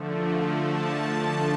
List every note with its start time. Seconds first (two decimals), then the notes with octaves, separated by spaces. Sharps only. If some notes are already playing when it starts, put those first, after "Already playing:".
Already playing: D3 F3 A3
0.60 A5